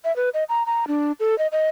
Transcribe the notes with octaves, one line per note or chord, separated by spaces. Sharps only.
E5
B4
D#5
A#5
A#5
D4
A4
D#5
D#5